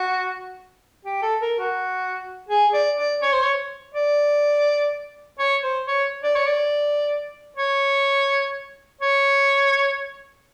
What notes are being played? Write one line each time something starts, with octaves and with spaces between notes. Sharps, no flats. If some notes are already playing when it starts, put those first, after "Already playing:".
Already playing: F#4
G4
A4
A#4
F#4
G#4
D5
D5
C#5
C5
C#5
D5
C#5
C5
C#5
D5
C#5
D5
C#5
C#5